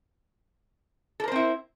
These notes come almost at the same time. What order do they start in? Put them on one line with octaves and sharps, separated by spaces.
A4 A#4 C5 C4 E4